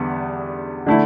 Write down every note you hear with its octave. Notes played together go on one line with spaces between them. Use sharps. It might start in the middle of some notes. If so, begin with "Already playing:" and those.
Already playing: E2 D3 G3 B3
D3 A3 E4